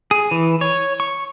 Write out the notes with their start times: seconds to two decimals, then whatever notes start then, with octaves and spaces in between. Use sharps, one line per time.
0.11 G#4
0.31 E3
0.61 C#5
1.00 C#6